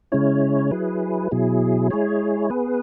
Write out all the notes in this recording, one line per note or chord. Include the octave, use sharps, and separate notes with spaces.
C#3 G#3 C#4 E4 C#5
F#3 E4 G#4 B4
B2 F#3 E4 G#4
G#3 E4 G#4 C#5
B3 G#4 B4